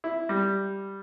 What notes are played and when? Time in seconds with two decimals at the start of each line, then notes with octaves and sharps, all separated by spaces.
0.04 E4
0.29 G3